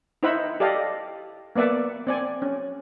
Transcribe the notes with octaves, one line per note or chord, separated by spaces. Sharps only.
D#4 E4 C5 E5 F#5 B5
G4 A4 D5 D#5 F5
A#3 B3 D5 E5 F#5
C4 D5 G#5
C#4